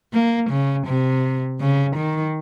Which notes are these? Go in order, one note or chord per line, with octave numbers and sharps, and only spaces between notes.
A#3
C#3
C3
C#3
D#3